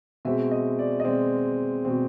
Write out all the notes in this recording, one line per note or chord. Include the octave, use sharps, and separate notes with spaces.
B2 G#3 C4 E5
D#5
D5
D#5
B2 G#3 C4 D5
B2 G#3 C4